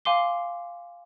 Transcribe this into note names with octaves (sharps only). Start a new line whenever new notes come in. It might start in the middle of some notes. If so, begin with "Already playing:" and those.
F5 G#5 C6 D6 C7 G7